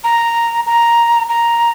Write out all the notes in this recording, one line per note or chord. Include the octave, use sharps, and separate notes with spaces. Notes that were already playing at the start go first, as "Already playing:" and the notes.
A#5
A#5
A#5